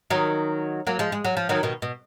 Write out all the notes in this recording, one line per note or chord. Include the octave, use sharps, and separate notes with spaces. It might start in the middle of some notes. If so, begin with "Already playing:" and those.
D#3 F#3
F#3 A#3
F3 G#3
G#3
F#3
F3
D#3 F#3
B2 D#3
B2